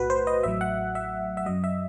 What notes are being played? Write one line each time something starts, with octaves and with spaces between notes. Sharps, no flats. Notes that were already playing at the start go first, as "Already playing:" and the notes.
Already playing: B1 A2 F#4 B4
C5
D#5
A1 A2 F#3 E5
F#5
E5
E5
F#2 F#3 D#5
E5